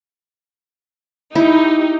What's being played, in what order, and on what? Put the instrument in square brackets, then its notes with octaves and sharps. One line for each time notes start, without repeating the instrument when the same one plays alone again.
[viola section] D#4 G4 [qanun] E4